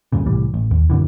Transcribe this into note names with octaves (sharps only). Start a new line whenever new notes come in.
D2 G2 A#2 C#3
C2 A2 E3 G3
A1
D#2
F#2 A#2 D3 E3